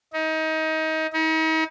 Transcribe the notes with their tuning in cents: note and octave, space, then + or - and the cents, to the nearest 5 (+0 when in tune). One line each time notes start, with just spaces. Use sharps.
D#4 +25
D#4 +40